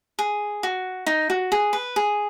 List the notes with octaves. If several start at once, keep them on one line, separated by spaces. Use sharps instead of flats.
G#4
F#4
D#4
F#4
G#4
B4
G#4